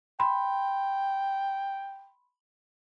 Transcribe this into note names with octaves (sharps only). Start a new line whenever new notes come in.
G5 B5 C6